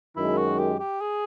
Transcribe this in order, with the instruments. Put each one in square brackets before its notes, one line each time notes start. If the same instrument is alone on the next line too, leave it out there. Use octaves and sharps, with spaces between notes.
[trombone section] F#2 D#3 G#3 [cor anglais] E4
[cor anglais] F#4
G4
G4
G#4